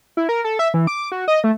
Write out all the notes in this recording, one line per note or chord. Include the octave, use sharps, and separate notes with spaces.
E4
A#4
A4
E5
E3
D6
F#4
D#5
A3